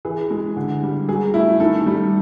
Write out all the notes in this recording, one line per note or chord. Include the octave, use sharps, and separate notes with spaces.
E3 G#4
G#3
D3
G3
F#3 G#4
A3 E4
D#3 A4
G3